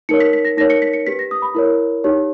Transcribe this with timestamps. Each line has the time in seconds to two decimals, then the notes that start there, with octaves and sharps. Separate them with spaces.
0.09 D#4 A#4 C#5 C#7
0.20 B6
0.33 B6
0.45 A#6
0.57 D#4 A#4 C#5 A#6
0.70 C#7
0.82 B6
0.93 C#7
1.07 G4 B4 B6
1.19 A#6
1.31 D#6
1.42 B5
1.55 E4 A#4 C#5
2.04 D#4 G4 C#5